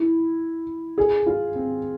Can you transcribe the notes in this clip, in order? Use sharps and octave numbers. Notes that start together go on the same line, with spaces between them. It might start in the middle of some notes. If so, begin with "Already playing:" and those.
Already playing: E4
G#4
F4
C4